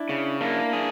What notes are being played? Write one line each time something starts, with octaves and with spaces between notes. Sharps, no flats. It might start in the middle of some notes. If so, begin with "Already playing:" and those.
Already playing: D4 E4
C#3
A#3 D4 E4
G#4